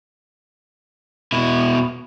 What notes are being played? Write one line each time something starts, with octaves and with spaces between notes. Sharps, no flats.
B2 E4